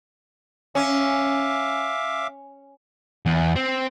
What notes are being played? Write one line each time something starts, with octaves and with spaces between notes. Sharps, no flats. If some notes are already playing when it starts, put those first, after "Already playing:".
C#4 E5 F5 D6
E2
C4